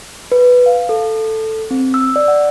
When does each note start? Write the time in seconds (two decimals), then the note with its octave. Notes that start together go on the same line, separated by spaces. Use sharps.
0.32 B4
0.66 F5
0.89 A4
1.71 C4
1.94 E6
2.16 D5
2.28 F#5